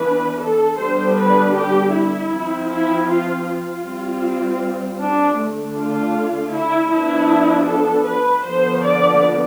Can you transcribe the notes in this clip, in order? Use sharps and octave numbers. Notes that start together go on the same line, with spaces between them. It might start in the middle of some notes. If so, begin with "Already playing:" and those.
Already playing: E3 B3 D4 B4
A4
D3 G3 B3 D4 C5
B4
G4
E4
F3 C4
E4
F4
F4
G3 C4
D4
D3 A3 D4
F4
E4
F3 B3 D4 E4
A4
B4
D3 F3 B3 C5
D5